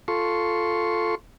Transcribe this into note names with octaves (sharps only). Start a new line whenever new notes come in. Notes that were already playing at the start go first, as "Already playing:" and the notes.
F4 A4 C6 C#6